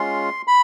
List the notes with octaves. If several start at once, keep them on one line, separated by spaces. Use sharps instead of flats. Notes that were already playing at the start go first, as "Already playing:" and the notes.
Already playing: G#3 C#4 F4 C6
B5